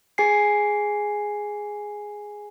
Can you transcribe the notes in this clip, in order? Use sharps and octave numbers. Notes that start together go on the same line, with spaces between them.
G#4 G#5 C7